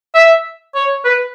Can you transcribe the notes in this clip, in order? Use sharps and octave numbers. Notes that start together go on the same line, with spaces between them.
E5
C#5
B4